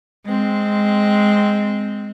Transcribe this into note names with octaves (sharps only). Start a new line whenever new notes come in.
G#3 C4